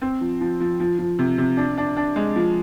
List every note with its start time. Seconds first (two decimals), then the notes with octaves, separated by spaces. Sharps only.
0.02 C4
0.21 F3
0.41 F3
0.60 F3
0.80 F3
0.99 F3
1.19 C3
1.38 C3
1.57 D4
1.78 D4
1.97 D4
2.16 G#3
2.36 F3